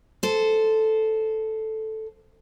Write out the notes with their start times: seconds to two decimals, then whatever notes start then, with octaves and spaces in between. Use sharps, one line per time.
0.23 A4 C5